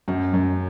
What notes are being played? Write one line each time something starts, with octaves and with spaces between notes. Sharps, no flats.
F#2 C#4
F#2